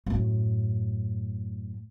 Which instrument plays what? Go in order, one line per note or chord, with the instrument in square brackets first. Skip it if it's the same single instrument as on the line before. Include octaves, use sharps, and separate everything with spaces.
[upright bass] F#2 A2